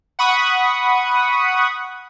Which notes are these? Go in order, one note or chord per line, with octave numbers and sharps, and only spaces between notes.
F#5 B5 C#6 D#6